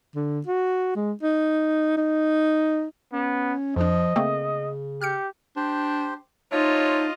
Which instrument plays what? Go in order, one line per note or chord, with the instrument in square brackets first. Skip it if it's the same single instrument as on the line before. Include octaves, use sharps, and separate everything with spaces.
[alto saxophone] D3
F#4
G#3
D#4
D#4
[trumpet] B3 [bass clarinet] C#4
[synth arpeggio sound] F2 D4 [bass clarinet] F3 [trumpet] D#5
[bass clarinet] C#3 [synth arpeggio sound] A3 A#3 C4
[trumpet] G4 [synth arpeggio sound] F6 G6 C#7
[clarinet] D4 [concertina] G4 C5
[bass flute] D#4 [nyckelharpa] F4 D#5 [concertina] C5 E5 A5 [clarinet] C#5